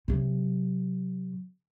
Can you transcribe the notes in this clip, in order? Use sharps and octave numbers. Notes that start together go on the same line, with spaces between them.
C3 F#3